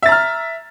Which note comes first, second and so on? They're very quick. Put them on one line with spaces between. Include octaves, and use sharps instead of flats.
E5 A6 A#5 F6